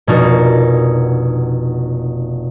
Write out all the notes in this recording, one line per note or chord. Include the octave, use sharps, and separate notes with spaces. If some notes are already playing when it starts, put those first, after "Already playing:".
F1 B2 A#3 D4 D#4 F#4